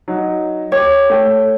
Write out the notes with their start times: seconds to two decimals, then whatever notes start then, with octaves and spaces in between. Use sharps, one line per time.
0.08 F#3 D#4
0.72 G4 C#5
1.10 A3 G5